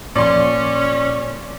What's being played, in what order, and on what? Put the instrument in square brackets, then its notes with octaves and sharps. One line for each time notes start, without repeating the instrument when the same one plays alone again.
[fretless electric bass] A#2 F3 [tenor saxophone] C#4 [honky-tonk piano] D5 C6